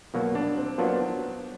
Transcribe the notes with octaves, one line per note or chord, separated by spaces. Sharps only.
B2 F#3 A#3
D4
C4
F#3 A#3 B3 D4 F4